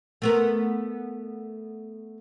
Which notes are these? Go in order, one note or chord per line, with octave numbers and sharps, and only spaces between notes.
A3 B3 A#4